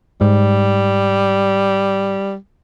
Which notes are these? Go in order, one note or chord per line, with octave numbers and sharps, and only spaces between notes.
G#2 G3